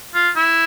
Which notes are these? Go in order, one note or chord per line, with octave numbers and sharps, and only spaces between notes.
F4
E4